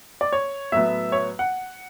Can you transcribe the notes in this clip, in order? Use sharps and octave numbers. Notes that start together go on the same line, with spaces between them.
D5
C#5
A2 F#3 B3 E5
C#5
F#5